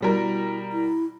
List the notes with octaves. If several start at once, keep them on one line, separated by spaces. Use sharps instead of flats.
B2 G3 E4 A#4
E4